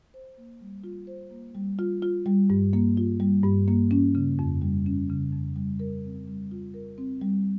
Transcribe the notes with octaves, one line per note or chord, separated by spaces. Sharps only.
C5
A#3
G3
F4
C5
A#3
G3
F4
F4
G3
G2
A#3
F4
G3
G2
A#3
C#4
C#3
F2
G3
C#4
C#3
F2
G3
A#4
C4
G3
F4
A#4
C4
G3